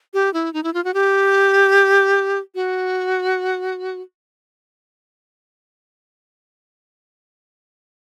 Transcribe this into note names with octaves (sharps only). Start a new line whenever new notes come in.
G4
E4
D#4
E4
F4
F#4
G4
F#4